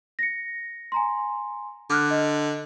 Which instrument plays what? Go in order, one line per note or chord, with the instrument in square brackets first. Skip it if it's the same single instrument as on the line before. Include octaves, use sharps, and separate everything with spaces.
[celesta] A#6 C#7
G#5 A#5 C6
[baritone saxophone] D3 [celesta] D6 F6 F#6
[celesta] D#5